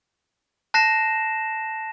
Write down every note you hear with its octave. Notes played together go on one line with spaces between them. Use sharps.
A5 F#6 A#6 C7 E7